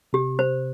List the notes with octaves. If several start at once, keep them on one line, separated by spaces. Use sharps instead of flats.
C3 G4
C5